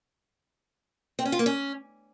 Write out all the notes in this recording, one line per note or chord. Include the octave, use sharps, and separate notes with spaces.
C4
C#4
F4
A#3
C#4